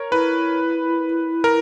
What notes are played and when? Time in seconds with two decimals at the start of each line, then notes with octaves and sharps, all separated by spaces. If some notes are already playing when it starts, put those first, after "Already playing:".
Already playing: A#4 C#5
0.12 E4 B4
1.44 A#4